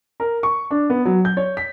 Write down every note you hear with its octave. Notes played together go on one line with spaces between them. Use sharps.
A#4
C#6
D4
B3
F#3
G6
C#5
B6